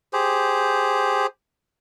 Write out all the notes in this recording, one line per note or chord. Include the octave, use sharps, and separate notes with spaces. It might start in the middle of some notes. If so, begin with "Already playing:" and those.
G4 G#4 C5